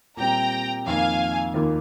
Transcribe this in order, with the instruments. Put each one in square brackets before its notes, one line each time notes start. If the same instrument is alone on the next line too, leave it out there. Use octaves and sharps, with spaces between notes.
[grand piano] A#2 G3 C4 [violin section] G5 A#5
[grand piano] F2 D#3 A#3 [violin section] F5 G#5
[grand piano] D#2 D#3 A#3 F4